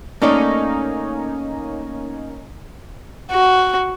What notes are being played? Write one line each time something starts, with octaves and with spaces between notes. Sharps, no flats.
A3 A#3 C#4 D#4 D5 D#5
F#4